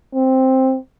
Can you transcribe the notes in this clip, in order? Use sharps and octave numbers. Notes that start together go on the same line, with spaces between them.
C4